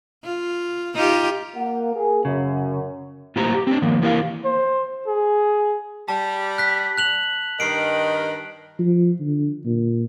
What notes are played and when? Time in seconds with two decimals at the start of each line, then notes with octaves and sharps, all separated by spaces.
0.24 F4
0.95 D#4 F4 G4
1.56 A#3 F#5
1.94 G#4 A#4
2.25 F#2 C#3
3.36 A2 A#3 F4 G4 C5 A#5
3.54 G4
3.67 C4 D4
3.82 D#3 F3 A#3
4.02 E3 A#3 E4 G4 A#4 F5
4.45 C5
5.07 G#4
6.09 G3 A5
6.58 F#6 B6
6.98 F#6 F7 F#7
7.60 G2 D#3 C7 D7
8.79 F3
9.20 D3
9.65 A#2